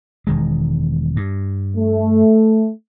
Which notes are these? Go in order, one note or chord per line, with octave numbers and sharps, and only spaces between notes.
E1 D#3 G#3
G2
A3